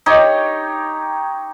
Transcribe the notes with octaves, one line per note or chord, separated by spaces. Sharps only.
D#4 G4 C#5